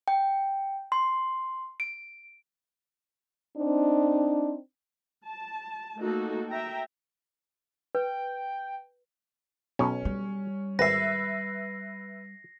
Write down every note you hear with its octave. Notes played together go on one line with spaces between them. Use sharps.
G5
C6
D7
C4 D4 D#4
A5
A3 A#3 D#4 F#4 A4
E5 G5 A#5
B4 G5
B1 B2 C#4
G3
G#1 B4 E5 A#6 C7